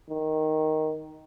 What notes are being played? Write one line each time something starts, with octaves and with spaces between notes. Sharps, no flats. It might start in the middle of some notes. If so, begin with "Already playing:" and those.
D#3